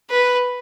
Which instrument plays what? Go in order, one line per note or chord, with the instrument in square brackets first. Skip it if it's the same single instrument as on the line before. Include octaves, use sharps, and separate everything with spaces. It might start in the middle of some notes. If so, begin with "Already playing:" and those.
[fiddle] B4